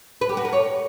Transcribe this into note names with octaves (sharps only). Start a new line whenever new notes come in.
B4
G4
F#4
A#4
C#5